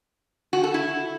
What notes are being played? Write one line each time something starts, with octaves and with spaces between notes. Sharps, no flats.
F#4
A4
E4